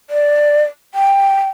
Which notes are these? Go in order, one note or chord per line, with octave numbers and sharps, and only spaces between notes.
D5
G5